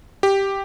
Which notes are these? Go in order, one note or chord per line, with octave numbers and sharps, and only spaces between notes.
G4